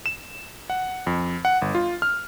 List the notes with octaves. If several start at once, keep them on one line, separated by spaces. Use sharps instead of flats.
E7
F#5
F2
F#5
G1
F4
F6